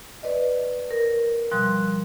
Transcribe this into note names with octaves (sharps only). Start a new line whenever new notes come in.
B4 D5 D#5
A#4
B2 F3 G3 C6 F#6